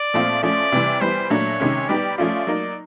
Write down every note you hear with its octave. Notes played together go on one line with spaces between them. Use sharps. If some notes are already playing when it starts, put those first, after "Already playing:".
Already playing: D5
A#2 F3 A3 C4 F4
F3 A3 C#4 D5
C3 E3 G3
E3 G3 B3 C5
A#2 F#3 A3 D4 C#5
C3 D#3 G#3 C#4
G3 B3 D#4 G4 D5
F3 A3 C#4 F4 D5
F#3 A#3 D#4